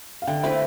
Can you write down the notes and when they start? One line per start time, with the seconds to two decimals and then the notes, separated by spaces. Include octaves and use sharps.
0.22 F5
0.27 D3 E5 G5
0.43 A3 E4 B4 C5 E5